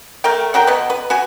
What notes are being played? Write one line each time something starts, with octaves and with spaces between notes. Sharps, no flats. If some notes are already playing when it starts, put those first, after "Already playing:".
A3 A#4 G5
F#3 F#4 A#4 G5
B2 B4
B4
F#4 B4 G#5